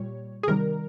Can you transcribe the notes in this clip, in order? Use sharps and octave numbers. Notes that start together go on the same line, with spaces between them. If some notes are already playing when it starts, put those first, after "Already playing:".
Already playing: A#2 G3 C#5
G#4
C3 D#3 G3 A#4